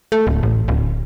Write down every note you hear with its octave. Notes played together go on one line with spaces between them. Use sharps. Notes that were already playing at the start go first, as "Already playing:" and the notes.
A3
D1
A1
D1